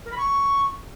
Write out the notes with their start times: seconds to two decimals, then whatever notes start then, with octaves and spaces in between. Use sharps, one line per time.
0.05 A#4
0.11 B5
0.17 C#6